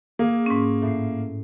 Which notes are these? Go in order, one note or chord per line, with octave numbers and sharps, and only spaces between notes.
A#3 G#4
G#2 C#4
A2 C7